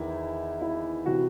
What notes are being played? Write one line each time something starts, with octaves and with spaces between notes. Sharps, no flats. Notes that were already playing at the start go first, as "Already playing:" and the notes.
Already playing: E2 D#3 E4
E4
C3 E3 F#4